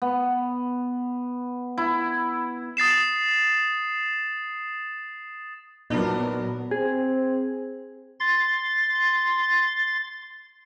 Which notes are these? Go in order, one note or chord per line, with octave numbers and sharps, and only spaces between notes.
B3
E4
D#6 A6 C7 E7
A#2 F#3 B3 D4 D#4 A#4
C4 G#4
C6 A6